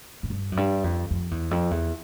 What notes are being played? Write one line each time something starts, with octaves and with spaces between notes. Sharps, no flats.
G#2
G2
F#2
G2
F2
F2
E2
F2
E2